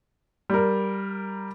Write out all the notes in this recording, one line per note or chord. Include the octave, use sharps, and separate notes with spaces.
G3 A#4